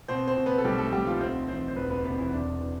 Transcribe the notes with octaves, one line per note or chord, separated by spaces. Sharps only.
B2 C4 C5
C4 C5
B2
B3 B4
A4
B1 G3 G4
A3 A4
B1 G3 G4
F3 F4
D2 C4 C5
E3 C4 C5
C5
E1 B3 B4
B3 B4
C3 B3 B4
E3 E4
E2 D4
E3